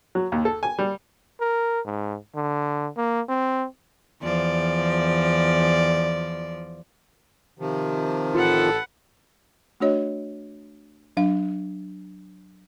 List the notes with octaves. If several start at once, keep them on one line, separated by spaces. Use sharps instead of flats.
F#3
D#2
A4
G#5
G3
A#4
G#2
D3
A#3
C4
E2 F3 D5
C3 D#3 F3
A1 F4 A4 B4 F#5
A3 D4 F#4 C#5 D#5
F#3 D4 F5